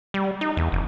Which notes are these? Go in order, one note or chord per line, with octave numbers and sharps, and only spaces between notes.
G3
D#4
E2
F#1